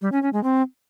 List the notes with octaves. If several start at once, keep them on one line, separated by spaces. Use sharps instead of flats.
G3
C#4
C#4
G#3
C4